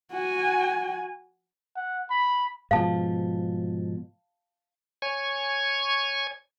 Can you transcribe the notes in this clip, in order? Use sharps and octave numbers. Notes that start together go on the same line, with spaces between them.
F#4 G#5
F#5
B5
G#2 B2 F3 F5 A5
C#5 G#5 C#6 G#6